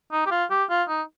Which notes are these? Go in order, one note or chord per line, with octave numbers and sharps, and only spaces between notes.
D#4
G4
F4
G4
F4
D#4